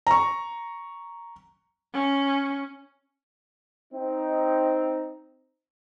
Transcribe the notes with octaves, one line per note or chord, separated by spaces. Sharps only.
A#5 C#6
C#4
C4 D#4